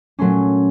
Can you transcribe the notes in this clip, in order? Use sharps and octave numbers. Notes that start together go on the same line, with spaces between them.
A#2 F#3 A3 C#4 C6